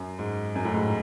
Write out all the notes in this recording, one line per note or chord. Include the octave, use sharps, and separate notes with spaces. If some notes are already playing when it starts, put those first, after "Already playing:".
Already playing: F#2
G#2
F#2
A2
G#2